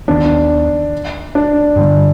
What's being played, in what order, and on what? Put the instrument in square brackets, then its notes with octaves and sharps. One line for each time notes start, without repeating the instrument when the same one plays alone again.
[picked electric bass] D#2 D#3 B3 [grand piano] D4
[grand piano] D4
[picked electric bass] G2 D3 G3